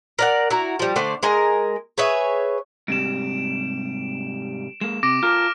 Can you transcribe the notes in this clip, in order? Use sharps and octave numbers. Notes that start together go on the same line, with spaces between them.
A#4 D5 F#5
E4 F#4 A#5
F3 G3
D3 A3 C5 D5
G#3 G#4 A#4
G#4 B4 C#5 E5
G#2 C3 G3 D7 E7
G#3 A#3 E7
C3 D6 A#6 D7
F4 A4 A#4 D6 F6